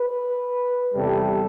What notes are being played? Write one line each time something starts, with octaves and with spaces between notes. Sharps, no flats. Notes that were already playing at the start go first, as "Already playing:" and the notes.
Already playing: B4
E2 C3 G3 A4